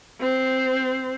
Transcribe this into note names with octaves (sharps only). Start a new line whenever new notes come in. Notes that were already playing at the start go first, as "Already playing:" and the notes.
C4 C5